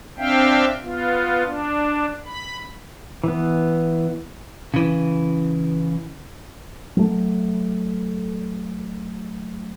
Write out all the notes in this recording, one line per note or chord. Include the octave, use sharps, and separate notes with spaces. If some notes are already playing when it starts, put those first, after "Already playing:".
C4 D4 E5 F5 G5
B3 F4
D4
B5
E3 B3
C#3 E3
F#3 A3